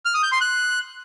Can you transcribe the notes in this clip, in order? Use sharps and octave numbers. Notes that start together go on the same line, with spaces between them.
F6
D#6
G6
C6
F#6